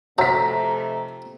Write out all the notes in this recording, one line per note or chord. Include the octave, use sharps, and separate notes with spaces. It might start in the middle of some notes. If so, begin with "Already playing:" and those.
F2 C3 F#3 A3 C5 E5 A#5 B6